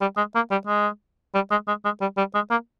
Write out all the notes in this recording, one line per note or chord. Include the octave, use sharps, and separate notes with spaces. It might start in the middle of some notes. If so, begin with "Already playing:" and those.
G3
G#3
A#3
G3
G#3
G3
G#3
G#3
G#3
G3
G3
G#3
A#3